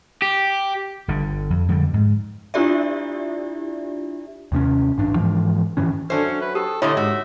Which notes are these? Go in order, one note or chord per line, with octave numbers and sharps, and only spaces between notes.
G4
G1 G2 D3
F2
F2 D3 G3
G#2
D4 E4 F4 G4 D5 E5
D#2 C3 B3 C#4
A1 G2 D4
G#2 E3 F3
G2 D#3 E3 C#4
F#3 C#4 D4 A4 C5 E5
B4
G4 A4 D#6
A#2 D3 A3 E4 C#5 D#5
G#2 F#4 E5